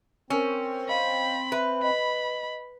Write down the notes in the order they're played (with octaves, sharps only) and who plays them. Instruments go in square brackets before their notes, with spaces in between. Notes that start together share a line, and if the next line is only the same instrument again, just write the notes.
[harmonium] C4 [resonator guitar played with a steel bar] C#4 [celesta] A#4 E6
[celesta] D#5 F5 [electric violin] B5
[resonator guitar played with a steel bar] B4 [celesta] E5 B5
[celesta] D#5 [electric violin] B5